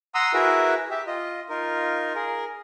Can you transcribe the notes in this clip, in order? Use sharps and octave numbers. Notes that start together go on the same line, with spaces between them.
F#5 A#5 C6 D#6 E6
E4 F#4 G#4 A#4 B4 E5
G4 E5
F4 D#5
D#4 F4 A#4
G#4 A#4